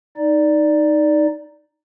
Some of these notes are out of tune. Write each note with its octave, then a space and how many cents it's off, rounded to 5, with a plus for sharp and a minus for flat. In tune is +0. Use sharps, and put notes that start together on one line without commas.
D#4 +0 D5 +0